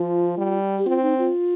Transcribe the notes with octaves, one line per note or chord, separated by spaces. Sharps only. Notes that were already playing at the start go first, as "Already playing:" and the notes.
Already playing: F3 F4
G3
G4
C4 F4
D#4
F4